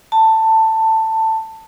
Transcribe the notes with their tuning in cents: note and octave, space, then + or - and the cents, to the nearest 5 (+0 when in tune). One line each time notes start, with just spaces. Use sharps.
A5 +15